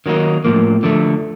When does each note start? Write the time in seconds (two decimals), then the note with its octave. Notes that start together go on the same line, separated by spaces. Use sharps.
0.06 D#3 F#3 A#3 D#4
0.45 A2 F3 A#3
0.83 D3 F3 A3